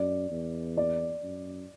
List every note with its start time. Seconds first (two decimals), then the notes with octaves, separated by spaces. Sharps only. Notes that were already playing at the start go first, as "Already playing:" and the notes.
Already playing: F#2 D5
0.31 E2
0.77 D5
1.24 F#2